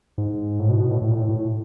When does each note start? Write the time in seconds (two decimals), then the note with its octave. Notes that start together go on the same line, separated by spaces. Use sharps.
0.18 G#2
0.59 A2
0.69 B2
0.80 B2
0.91 A2
1.02 A2
1.11 A#2
1.15 A2
1.29 A2